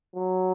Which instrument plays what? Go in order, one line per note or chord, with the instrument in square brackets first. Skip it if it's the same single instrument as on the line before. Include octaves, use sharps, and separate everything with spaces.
[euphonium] F#3